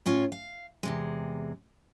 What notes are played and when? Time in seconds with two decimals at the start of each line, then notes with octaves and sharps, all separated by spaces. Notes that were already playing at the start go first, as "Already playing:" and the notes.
0.06 A2 C#4 F4 C#5
0.32 F5
0.83 E2 C3 G#3